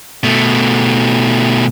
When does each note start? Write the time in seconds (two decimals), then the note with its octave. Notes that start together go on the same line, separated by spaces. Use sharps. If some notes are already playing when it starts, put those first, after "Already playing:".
0.23 B2 A3